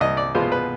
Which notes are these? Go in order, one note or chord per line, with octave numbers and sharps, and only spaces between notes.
C2 D#5
D5
B2 G#3 B3 F4 C5
B4